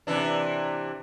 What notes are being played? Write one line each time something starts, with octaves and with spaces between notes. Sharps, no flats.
C3 E3 D4